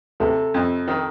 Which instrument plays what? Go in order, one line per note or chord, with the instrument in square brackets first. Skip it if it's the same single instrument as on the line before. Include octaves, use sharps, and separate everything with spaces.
[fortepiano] C3 [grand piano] A4
[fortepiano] F2
D#3